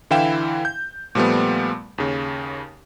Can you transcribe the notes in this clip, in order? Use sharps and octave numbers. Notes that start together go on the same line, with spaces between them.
D3 E3 E4 F5 G5 E7
G6
A#2 F3 G3 A3 B3
D#2 C#3